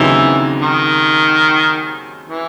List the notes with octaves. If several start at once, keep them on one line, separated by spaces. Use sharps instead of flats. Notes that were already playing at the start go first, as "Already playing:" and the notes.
Already playing: D#2 C#3 E3 F#3 C4 D#4
D#3
E3